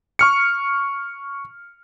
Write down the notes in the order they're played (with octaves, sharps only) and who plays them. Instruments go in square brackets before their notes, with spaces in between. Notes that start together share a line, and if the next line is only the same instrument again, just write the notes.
[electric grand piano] C#6 F6 C#7